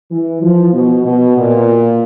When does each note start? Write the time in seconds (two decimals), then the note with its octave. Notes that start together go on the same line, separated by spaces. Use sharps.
0.11 E3
0.42 F3
0.73 B2
1.04 B2
1.37 A#2